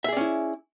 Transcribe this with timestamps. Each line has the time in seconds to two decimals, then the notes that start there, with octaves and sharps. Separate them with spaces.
0.04 E5
0.08 G#4
0.13 D5
0.17 C#4
0.21 E4